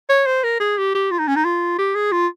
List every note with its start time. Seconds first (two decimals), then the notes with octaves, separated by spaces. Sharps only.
0.10 C#5
0.27 C5
0.44 A#4
0.60 G#4
0.78 G4
0.95 G4
1.11 F4
1.19 D#4
1.28 C#4
1.36 D#4
1.45 F4
1.79 G4
1.95 G#4
2.12 F4